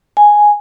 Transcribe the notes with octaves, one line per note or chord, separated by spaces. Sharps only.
G#5